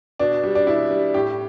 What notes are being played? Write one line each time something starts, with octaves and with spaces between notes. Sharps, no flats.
B2 D4
G3
D4
B2 E4
G3
A2 G4